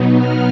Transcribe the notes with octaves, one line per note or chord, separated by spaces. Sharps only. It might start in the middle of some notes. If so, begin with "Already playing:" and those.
Already playing: B2 F#3 B3 D#4
F6